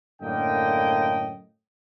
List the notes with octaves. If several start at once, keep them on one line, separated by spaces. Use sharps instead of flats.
F#2 A2 D3 A#3 D#5 G5